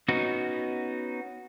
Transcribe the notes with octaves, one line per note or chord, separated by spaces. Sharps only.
B3 C#4 D#4 F#4